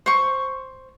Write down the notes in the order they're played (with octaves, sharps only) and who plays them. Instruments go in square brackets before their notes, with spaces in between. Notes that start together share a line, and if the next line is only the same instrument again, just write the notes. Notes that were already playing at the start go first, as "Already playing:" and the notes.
[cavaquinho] C5 C#6